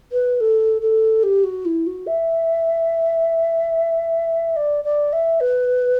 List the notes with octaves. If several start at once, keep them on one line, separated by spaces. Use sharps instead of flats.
B4
A4
A4
G4
F#4
E4
F#4
E5
D5
D5
E5
B4